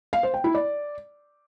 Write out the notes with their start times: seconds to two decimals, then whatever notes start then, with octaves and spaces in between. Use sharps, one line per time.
0.13 F5
0.23 C5
0.34 G5
0.44 E4
0.55 D5